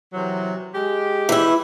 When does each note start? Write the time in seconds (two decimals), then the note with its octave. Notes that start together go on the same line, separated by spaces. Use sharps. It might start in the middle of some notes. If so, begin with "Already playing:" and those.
0.13 C3 E3 F#3
0.74 G#3 G4
1.29 E3 E4